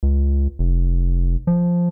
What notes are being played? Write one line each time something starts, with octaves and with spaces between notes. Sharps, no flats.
C#2
F1
F3